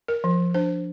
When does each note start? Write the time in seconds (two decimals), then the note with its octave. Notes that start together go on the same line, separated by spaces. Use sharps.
0.08 A#4
0.24 F3
0.54 D4 C5